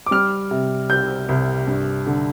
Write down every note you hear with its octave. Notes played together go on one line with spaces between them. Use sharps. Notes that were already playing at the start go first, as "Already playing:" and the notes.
D6
G3 F6
C3
C2 G6
C2
G2
D3